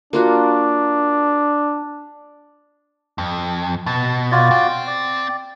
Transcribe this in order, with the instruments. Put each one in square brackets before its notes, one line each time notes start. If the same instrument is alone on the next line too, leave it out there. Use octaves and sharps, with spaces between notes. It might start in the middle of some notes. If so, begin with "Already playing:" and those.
[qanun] A#3 F4 F#4 [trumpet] D4
[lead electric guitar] F2
[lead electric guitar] B2 [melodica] A5
[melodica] F4 F#4 D5
[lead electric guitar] C4 G5
[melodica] D5